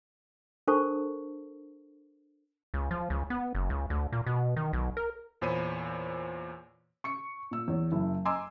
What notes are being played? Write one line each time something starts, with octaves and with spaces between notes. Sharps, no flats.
D4 A4 A#4 C5 A5 C#6
C#2
F3
C#2
B3
F#1
C#2
D2
A#2
B2
D#3
B1
A#4
E2 A#2 C5 C#5 B5 D#7
C#6 C#7
A#2 E6
E2 C#5
F#1 E4
D#5 G#5 A#5 C6 D6 E6